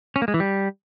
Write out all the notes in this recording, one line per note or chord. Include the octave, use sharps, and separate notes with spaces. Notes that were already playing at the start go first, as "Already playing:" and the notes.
C#4
A#3
G#3
E3
G3